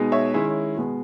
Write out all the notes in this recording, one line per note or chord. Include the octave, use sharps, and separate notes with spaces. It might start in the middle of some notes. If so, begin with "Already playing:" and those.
Already playing: B2 G#3 D#4
C#5 E5
D#3 G#3 C#4 E4
B2 G#3 B3